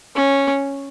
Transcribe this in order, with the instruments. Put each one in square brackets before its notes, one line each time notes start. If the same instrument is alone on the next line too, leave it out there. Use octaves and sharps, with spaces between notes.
[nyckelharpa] C#4